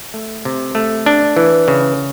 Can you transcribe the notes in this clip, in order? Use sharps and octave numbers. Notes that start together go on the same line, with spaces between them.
A3
C3
A3
D4
E3
C#3